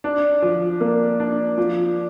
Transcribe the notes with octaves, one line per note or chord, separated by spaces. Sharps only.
D4
F3
A#3
D4
F3